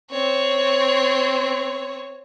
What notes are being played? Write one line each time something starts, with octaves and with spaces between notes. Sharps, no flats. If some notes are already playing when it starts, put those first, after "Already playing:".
C4 C#5